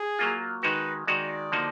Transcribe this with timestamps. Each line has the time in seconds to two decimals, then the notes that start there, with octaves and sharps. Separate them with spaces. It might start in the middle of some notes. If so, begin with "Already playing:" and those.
Already playing: G#4
0.18 F#3 A#3 F4
0.63 D#3 G#3 D#4 F#4 B4
1.08 D#3 G#3 D#4 F#4 D5
1.52 D3 F3 A#3 D#4 F#4